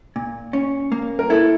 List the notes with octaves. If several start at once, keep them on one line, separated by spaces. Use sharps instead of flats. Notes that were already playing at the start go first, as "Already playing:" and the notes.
A#2
C#4
A#3
A#4
E4 A4